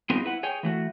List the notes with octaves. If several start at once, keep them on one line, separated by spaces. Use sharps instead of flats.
G3 B3 C4 D#4 F4 G#4
E4 B4 F#5
G#4 C#5 G5 G#5
E3 A3 F#4